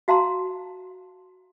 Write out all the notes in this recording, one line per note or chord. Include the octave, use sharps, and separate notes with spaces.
F#4 F5 A5 A#5 C6